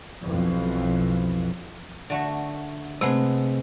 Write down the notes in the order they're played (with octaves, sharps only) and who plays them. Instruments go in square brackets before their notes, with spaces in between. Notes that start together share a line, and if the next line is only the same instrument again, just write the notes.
[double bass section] B1 F2 E3
[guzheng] D3 A3 F#4
[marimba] C3 A3 C4 [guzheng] G#3 B3 G#4